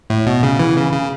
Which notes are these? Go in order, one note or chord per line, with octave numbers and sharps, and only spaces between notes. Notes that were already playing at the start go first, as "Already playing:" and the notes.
A2
B2
C#3
E3
C#3
C#3